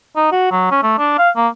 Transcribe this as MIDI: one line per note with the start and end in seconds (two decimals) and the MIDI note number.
0.16 0.30 63
0.32 0.51 66
0.51 0.71 54
0.71 0.82 61
0.83 0.97 57
0.98 1.17 62
1.18 1.30 77
1.36 1.48 58